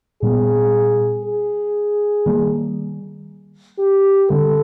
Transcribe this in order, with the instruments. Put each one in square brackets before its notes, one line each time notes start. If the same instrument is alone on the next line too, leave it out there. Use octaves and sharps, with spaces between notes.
[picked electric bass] A#2 G3 B3 [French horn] G#4
[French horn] G#4
[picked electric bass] D#3 G3 A#3
[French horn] G4
[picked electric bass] D3 G3 C4 [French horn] A4